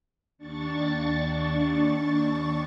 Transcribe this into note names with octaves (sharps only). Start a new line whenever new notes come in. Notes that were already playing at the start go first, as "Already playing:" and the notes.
D#2 D4 C#6 A6